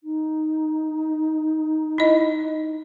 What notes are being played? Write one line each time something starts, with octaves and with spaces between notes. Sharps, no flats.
D#4
E4 D#5